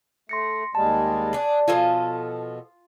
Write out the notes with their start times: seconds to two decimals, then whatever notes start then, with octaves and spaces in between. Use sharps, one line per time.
0.29 A3 C6 A#6 C#7
0.75 D#2 G3 G#3 A5
1.33 D4 G#4
1.68 B2 F3 F4 A4 D#5 G#5